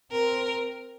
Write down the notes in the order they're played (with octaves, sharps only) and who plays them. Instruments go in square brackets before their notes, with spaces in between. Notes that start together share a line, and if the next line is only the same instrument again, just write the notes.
[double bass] C4 [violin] A#4